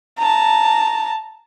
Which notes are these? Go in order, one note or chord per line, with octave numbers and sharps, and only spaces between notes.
A5 A#5